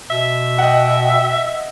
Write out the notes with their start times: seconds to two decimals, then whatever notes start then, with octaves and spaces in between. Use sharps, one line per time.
0.10 B2 E5
0.58 D#5 F#5 G5